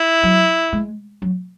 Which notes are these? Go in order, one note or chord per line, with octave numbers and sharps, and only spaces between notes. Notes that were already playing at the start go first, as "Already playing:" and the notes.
Already playing: E4
F#3
G#3
F#3